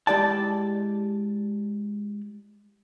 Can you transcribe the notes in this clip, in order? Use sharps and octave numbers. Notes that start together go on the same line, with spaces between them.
G#3 E4 G4 D5 G5 A5